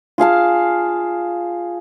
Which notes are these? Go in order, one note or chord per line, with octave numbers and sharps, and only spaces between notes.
F4 G#4 F5 A5